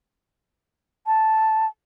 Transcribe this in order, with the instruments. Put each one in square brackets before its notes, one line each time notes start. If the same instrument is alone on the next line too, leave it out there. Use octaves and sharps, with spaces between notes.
[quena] A5